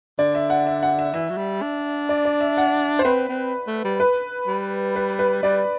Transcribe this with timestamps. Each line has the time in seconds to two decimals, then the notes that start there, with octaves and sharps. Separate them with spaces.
0.19 D3 D5
0.35 E5
0.50 F#5
0.67 E5
0.83 F#5
0.99 E5
1.14 E3 E5
1.30 F#3
1.37 G3
1.62 D4
2.09 D5
2.25 D5
2.40 E5
2.57 F#5
2.99 C5
3.05 C4 B4
3.29 C4
3.67 A3
3.84 G3
4.00 B4
4.47 G3
4.96 B4
5.19 B4
5.43 G3 D5